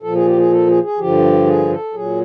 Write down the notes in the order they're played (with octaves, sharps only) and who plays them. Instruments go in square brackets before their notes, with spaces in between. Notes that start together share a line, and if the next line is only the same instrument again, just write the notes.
[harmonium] A#2 F3 A4
G#4
G4
G#4
A4
G#4
G#4
G2 D3 F3 G4
G#4
A4
A#2 F#3 G#4